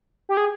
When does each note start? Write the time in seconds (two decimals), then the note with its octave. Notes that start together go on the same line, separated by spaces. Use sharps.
0.29 G4
0.37 G#4